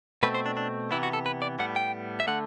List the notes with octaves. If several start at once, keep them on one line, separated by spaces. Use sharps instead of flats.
B2 A3 C4 B4
C5
D4
D4
C3 E3 B3 E4
F#4
A4
B4
D5
A2 G3 B3 F#5
G5
E5
D3 A3 F#5